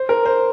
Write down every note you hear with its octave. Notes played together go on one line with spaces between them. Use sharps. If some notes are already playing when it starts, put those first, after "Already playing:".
Already playing: C5
A#4
C5